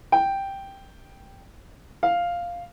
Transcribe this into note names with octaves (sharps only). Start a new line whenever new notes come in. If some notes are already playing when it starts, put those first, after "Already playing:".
G5
F5